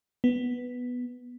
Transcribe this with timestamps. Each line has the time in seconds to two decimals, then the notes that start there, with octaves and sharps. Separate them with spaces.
0.24 B3